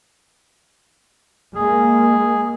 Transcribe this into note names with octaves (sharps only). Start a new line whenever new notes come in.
G#3 A#3 G#4